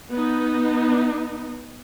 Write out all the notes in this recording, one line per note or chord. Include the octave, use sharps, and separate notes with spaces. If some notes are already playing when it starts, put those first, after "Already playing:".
B3 D#4